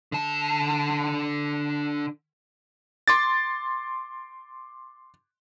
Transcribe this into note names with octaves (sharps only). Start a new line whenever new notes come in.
D3 A5
C6 D6 A6